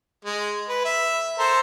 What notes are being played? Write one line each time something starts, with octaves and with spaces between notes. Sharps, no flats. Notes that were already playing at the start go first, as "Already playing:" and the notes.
G#3
B4
E5
A4 A#4 C5